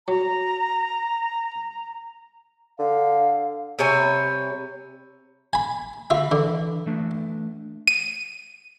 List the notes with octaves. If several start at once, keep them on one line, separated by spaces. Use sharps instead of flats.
F#3 A#5
D3 F5
C3 G3 C#5 G#5
G#5 B5
D3 F4 E5 B5
D3 E3
E3 A3 D4
D#7